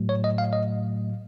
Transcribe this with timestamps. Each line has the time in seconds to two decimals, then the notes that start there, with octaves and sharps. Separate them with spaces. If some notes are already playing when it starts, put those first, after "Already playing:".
Already playing: A2 F#3 A3
0.09 C#5
0.24 D#5
0.38 F5
0.53 D#5